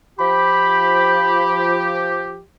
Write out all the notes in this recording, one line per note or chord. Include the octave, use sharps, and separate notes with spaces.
F3 G4 B5